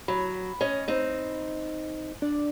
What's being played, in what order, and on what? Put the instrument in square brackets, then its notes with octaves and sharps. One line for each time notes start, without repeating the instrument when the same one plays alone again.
[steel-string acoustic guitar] F#3 [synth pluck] B5
[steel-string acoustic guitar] C#4 D#5
C4 D#4
[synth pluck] D4 D5